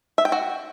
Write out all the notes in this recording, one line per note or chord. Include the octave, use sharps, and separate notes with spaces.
E5
G5
F#4